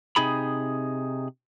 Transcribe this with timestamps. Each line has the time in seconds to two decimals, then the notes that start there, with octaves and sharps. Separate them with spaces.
0.16 C3 D#4 G#4 B5